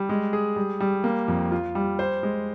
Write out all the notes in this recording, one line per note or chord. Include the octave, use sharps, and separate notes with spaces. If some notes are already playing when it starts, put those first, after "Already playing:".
Already playing: G3
G#3
G#4
G3
G3
A#3
F2
F4
G3
C5
G#3